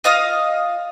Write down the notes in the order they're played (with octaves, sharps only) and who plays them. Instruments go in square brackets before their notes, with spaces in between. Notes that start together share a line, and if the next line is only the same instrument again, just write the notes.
[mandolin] F4 D#5 F5 D#6